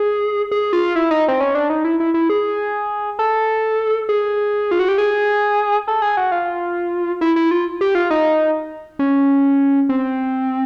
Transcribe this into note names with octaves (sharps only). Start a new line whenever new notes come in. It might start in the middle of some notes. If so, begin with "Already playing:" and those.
Already playing: G#4
G#4
F4
E4
D#4
C4
C#4
D4
D#4
E4
E4
E4
G#4
A4
G#4
F4
F#4
G4
G#4
A4
G#4
F#4
F4
E4
E4
F4
G4
F4
D#4
C#4
C4